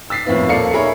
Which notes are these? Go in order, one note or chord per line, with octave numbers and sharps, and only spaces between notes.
E6 A6 B6 C7
F2 A2 A#3 B3 E4
D#1 A#3 A4 D5 C7 C#7
D#4 G#4 A#4 C#5 E5 B5